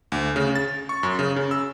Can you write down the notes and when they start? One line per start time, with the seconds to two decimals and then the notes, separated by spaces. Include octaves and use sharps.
0.12 D2
0.36 C#3
0.55 A6
0.89 C#6
1.03 F#2
1.19 C#3
1.36 C#3
1.51 E6